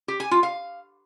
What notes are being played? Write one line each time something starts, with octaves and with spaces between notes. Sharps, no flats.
G4
G#5
F4
F5